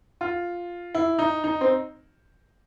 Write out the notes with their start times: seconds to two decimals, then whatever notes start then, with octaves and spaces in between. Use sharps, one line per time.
0.21 F4
0.95 E4
1.19 D#4
1.44 D#4
1.61 C4